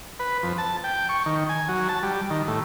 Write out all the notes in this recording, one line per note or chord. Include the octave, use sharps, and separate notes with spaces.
B4
F2
A5
G5
C#6
D#3
G#5
F#3
A5
G3
D#3
A2